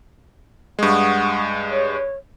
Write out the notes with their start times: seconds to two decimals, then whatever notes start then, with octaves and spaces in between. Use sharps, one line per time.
0.79 G2 G#3 F#5 C#6 D#6
1.70 C#5